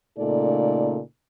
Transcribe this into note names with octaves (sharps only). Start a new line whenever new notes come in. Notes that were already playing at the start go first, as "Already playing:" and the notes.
A#2 C#3 A3 D#4 A4 D5